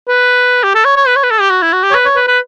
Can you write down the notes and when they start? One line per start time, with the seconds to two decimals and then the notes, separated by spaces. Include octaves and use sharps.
0.08 B4
0.63 G4
0.74 A4
0.85 C#5
0.96 C#5
1.07 B4
1.16 C#5
1.23 B4
1.31 A4
1.40 G4
1.50 F#4
1.62 E4
1.73 F#4
1.83 G4
1.91 C#5
1.94 B4
2.06 C#5
2.16 B4
2.28 B4